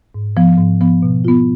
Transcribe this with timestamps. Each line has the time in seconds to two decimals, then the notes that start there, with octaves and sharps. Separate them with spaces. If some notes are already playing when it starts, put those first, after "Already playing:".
0.15 G#2
0.37 F3 B3
0.58 G#2
0.81 F3 B3
1.03 B2
1.25 B3 F4